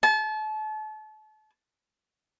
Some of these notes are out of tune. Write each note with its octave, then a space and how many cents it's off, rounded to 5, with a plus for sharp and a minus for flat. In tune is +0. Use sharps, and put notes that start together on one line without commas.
A5 -35